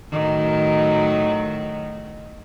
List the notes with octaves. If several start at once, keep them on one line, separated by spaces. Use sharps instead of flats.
A2 D#3 F#3